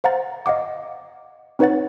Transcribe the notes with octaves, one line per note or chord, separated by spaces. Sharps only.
C5 F5 F#5 A#5 A6
D#5 F5 F#5 D6
C4 D#4 B4 C#5 F#5 A6